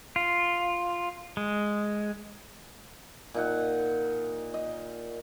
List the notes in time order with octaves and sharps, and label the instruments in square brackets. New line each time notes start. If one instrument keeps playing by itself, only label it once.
[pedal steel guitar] F4
G#3
[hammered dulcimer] A#2 D#4 F#5
D#5